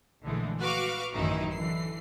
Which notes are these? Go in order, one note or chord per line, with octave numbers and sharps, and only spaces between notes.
A#1 D3 E3 G#3 A3
F#4 B4 F5 C#6 D6 F6
A1 F#2 D#3 E3 D#4 E4
D3 E3 C7